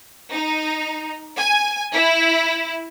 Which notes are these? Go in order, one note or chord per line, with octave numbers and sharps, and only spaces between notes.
D#4
G#5
E4